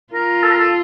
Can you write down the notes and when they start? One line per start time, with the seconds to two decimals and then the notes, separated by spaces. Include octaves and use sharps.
0.13 F4 A#4
0.43 A4
0.51 A#4
0.59 A4